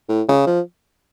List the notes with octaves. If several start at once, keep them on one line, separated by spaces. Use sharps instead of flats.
A2
C#3
F3